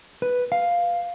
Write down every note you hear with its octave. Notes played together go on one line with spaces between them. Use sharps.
B4
F5